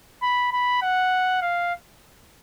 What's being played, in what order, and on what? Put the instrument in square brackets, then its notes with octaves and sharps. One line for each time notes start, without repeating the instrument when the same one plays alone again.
[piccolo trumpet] B5
B5
F#5
F5